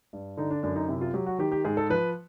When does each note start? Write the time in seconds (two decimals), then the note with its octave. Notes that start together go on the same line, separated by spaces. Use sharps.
0.13 G2
0.37 D3 D#4
0.51 D4
0.63 F#2 D4
0.76 D#4
0.88 C3 E4
1.01 F4
1.14 F#3 G4
1.27 F#4
1.39 D#3 G4
1.52 G4
1.65 G#2 G#4
1.77 A4
1.90 F3 B4